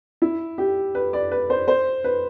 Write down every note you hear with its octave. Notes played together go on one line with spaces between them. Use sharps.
E4
G4
B4
D5
B4
C5
C5
B4